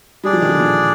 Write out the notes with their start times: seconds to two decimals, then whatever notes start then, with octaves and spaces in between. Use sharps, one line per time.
0.24 G3 D4 G#4 D5
0.33 F3
0.42 D#3
0.49 D3 F3
0.60 A#2 D3